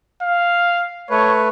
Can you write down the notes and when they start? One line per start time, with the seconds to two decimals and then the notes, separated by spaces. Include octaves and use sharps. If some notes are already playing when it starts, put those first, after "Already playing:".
0.22 F5
1.10 A3 B4 C#5